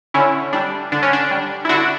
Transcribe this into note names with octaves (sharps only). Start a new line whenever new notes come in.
D3 C#4 E4
G3 D4
D3 D4
C#4
D4
G3
E4
D3 D4 F#4